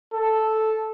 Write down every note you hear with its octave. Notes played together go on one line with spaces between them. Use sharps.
A4